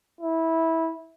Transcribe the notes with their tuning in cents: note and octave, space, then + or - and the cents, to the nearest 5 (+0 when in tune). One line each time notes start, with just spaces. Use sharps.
E4 -15